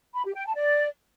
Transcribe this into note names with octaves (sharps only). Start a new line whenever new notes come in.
B5
G4
G5
A5
D5